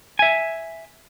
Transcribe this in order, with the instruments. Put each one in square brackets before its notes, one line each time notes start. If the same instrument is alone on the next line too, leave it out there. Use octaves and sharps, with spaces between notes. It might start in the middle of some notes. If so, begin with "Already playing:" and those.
[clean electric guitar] E5 G#5